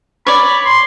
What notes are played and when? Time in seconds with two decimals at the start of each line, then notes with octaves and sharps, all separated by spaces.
0.27 C#5 D5 B5
0.65 C6